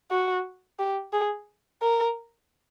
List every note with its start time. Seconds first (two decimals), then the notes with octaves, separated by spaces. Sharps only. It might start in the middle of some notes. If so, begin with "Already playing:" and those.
0.11 F#4
0.79 G4
1.13 G#4
1.82 A#4